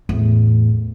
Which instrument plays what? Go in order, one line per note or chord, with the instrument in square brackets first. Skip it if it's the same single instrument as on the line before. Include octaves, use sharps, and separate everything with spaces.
[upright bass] E2 A2